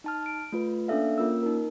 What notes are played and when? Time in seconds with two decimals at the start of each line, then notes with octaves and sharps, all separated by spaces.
0.04 D#4 A5 F6
0.26 D7
0.52 A3 F4 B4
0.88 A#3 C#4 D4 A4 E5 F5
1.18 A#3 C#4 F4 A#4 E6
1.43 D#4 A#4